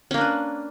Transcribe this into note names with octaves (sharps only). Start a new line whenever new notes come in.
A#3 C#4 D4 B4